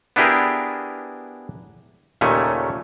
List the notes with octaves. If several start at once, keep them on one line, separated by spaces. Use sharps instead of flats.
B3 D4 E4 G4 G#4 A#4
D#2 A#2 C#3 A3 C#4